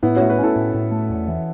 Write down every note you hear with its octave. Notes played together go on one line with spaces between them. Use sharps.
A2 B3 E4
A3 C#4 F#4
F#4 B4
C#4 E4 A4
A2
A2
A3
E2
E3